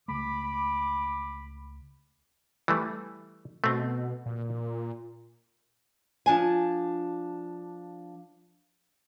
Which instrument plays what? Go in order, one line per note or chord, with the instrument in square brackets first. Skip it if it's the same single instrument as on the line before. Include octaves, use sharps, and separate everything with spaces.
[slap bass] C#2 A3 [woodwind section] B5 D6
[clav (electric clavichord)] E3 G3 A3
[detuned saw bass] B2 [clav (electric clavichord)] A3 C4
[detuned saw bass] A#2
[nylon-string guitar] F3 D4 G#5